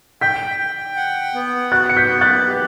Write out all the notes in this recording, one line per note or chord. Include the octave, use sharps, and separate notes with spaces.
G5 G6 B6
G5
F#5
B3
F#4 F#6 A6
C#7
G6 B6
B3
F#6 A6
G4